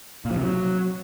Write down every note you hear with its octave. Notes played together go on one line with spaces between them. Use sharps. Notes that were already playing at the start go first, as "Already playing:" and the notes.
A#2
F3
C3
F#3